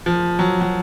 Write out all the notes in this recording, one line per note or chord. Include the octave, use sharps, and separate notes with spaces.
F3
F#3
F#3